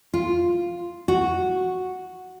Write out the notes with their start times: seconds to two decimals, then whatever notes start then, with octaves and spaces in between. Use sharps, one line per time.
0.14 F4
1.08 F#4